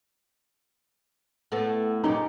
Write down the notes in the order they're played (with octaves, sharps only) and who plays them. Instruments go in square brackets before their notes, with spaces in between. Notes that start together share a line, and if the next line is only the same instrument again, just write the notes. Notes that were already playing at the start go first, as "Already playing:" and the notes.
[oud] A2 A3 B3
[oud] A#2 C#4 G4 [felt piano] D#4